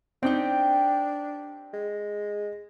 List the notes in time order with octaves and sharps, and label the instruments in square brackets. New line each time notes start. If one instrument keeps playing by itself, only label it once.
[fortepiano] C4 D#4 [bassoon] D4 [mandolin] G4 G5
[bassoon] G#3